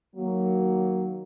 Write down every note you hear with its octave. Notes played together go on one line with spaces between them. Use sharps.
D#3 F#3 A#3